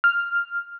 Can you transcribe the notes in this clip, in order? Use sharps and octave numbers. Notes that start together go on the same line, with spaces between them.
F6